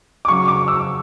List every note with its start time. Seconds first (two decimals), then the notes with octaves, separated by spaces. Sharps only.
0.25 D6
0.28 C#3 F#3 C#4 C#6
0.48 D6
0.68 E6